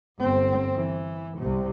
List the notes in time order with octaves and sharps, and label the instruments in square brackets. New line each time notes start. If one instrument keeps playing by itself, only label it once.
[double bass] G1 C4
E3
C2 C3